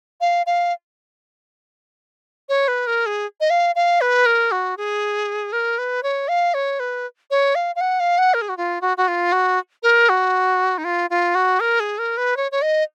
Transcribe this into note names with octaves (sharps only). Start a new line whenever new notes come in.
F5
F5
C#5
B4
A#4
G#4
D#5
F5
F5
B4
A#4
F#4
G#4
A#4
B4
C#5
F5
C#5
B4
C#5
F5
F5
F#5
F5
F#5
A#4
G#4
F#4
F4
F#4
F#4
F4
F#4
A#4
F#4
D#4
F4
F4
F#4
A#4
G#4
A#4
B4
C#5
C#5
D#5